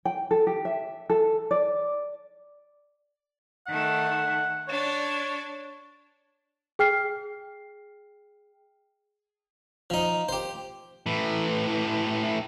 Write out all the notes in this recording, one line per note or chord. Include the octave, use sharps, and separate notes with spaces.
G5
A4
G4
E5
A4
D5
D#3 A3 F#5
D4 C#5 D5
G#4 G5 F6 C7
F3 D#4
G4 C5
A2 E3